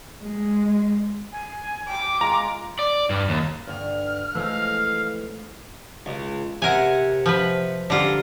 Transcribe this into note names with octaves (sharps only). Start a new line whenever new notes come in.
G#3
G#5
G5 D6
G#3 F4 A#5
D5
G2
D#2
G2 D3 F6
E3 F3 G#3 A3 F5 E6
C#2
C3 A#4 F#5 G#5
F3 B4
D3 G3 F4 A#5